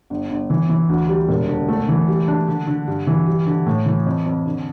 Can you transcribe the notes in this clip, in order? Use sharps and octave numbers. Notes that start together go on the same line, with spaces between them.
G1
G1
E3
E3
D2
G3
E1
D3
A3
E3
G3
D4
D3
D3
G2
E3
G3
D3
A2
E3
F2
F2
D3